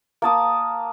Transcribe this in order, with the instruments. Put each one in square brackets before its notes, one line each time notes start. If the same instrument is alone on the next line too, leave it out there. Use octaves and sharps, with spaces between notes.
[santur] A#3 A5 D#6